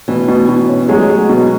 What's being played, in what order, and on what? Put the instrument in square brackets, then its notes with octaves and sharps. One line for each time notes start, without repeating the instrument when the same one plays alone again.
[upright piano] B2 [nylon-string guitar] E3
[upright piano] B2
B2
C#4
[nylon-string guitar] F#3 [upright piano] G#3
[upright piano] G#3
B2